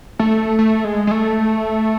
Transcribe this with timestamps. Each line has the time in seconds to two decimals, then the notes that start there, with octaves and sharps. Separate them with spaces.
0.19 A3
0.59 A3
0.84 G#3
1.07 G#3
1.11 A3